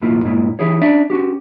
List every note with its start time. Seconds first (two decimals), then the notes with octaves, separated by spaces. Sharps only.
0.02 B1 E2 A2 A#3 E4 F4
0.24 G2 A#2 G#3 A#3 E4
0.59 E3 E4 G4 G#4 C#5
0.82 C#4 D4 D5 E5
1.10 C#4 F#4 G4